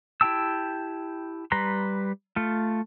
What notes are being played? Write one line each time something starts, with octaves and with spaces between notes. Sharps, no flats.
E4 G4 G5 A5 E6
G3 B4 A#5 C6
A3 F4